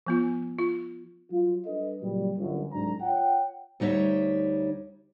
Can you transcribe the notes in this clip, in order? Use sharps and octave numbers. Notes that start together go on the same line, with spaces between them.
F3 B3 F4
F4
F#3 F4
G3 D4 A4 B4 D#5
A#2 C#3 F#3 G3
G1 F#2
C2 G#2 F#3 D4 A#5
F4 C#5 F#5 G5
D2 G3 D#4 C#5 E5